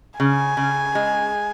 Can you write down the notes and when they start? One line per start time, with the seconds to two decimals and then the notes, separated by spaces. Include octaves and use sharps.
0.19 C#3 G#5
0.57 C#3
0.95 G#3